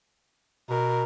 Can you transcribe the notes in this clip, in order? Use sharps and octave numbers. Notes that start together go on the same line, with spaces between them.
B2 A#4